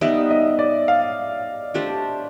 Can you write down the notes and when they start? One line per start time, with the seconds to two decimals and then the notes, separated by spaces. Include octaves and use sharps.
0.01 G3 B3 D#4 E5
0.31 D#5
0.59 D5
0.88 F5
1.74 A3 D4 G4 C5